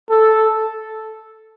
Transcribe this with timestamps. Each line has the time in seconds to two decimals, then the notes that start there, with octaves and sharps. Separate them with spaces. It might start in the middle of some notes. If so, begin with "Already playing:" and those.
0.10 A4